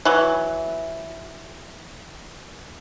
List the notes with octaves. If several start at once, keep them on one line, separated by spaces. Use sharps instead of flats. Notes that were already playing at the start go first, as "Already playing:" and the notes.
E3 F#3